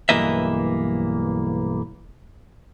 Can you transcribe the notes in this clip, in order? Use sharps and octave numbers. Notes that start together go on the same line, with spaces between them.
B1 G2 E3 A#3 D#5 E5